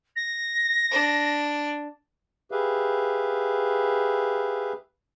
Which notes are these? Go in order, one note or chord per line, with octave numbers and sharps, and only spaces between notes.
A#6
D4
G4 G#4 B4 E5 F5